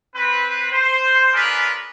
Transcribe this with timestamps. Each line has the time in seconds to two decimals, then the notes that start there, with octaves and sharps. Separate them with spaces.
0.15 C4 B4
0.71 C5
1.33 C#4 D4 F4 G#4 A#4 B4